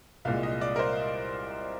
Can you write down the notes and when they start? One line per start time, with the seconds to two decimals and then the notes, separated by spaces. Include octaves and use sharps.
0.25 C2 A#2 G#3 F5
0.43 D#5
0.61 D5
0.76 A#4
0.79 C5